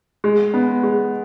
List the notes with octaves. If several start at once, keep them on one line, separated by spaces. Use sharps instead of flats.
G#3
B3
G#3